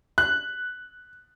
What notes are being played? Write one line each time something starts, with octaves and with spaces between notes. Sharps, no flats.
F#6